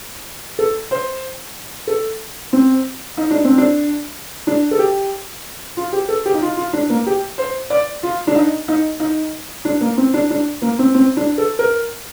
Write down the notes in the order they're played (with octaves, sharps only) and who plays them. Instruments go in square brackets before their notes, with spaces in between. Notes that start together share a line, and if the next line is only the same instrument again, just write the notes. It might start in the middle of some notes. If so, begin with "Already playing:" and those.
[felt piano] A4
C5
A4
C4
D#4
D4
C4
D4
D4
A4
G4
F4
G4
A4
G4
D#4
F4
F4
D4
A#3
G4
C5
D5
F4
D4
D#4
D#4
D#4
D4
A#3
C4
D4
D4
A#3
C4
C4
D4
A4
A#4